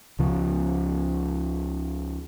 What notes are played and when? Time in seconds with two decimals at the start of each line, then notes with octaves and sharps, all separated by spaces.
0.19 C#2 C#3 F3